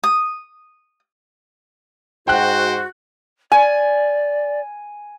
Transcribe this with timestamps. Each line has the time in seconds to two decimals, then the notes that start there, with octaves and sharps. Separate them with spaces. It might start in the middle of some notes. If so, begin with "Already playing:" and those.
0.04 D#6
2.28 G#2 F#4 C5 G5 F#6
3.52 D5 G#5